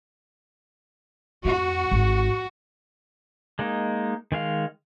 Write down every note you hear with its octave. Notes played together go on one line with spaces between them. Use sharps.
F2 C4 F#4
G#1
G#3 A#3 D#4
D#3 G#3 F5